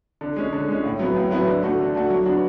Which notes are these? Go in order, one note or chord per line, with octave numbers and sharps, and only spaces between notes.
D3
G#3 C#4
D3
G#3 C#4
A2
F#3 B3 E4
A2
F#3 B3 E4
D3
A3 D4 F#4
D3
A3 D4 F#4
F#3
B3 D4 F#4